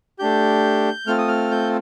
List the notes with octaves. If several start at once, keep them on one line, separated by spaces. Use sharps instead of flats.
A3 D4 G4 G6
A3 C4 F4 F6
D#6
F6
G6